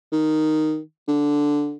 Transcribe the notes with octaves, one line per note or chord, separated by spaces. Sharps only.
D#3
D3